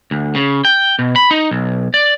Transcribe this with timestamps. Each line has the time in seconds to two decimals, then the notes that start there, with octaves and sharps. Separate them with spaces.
0.11 D2
0.35 C#3
0.65 G5
0.99 B2
1.16 B5
1.31 D#4
1.51 B1
1.94 D5